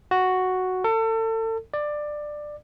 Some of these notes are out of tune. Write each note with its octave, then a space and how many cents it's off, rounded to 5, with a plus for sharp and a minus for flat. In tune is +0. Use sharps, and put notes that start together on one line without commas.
F#4 +0
A4 +35
D5 +15